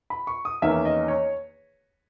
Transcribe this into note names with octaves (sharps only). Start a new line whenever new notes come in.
B5
C#6
D#6
E2 D#3 A#3 C#4 E5
D#5
C#5